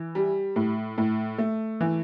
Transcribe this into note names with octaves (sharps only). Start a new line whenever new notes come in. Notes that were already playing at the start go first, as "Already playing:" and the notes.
Already playing: E3
G3
A2
A2
A3
E3